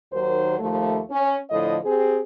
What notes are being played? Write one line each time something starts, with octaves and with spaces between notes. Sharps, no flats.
D#2 D#3 F#3 A#4 C5
D#2 F3 A3
C#4
A2 D3 F3 D#5
C4 G4 G#4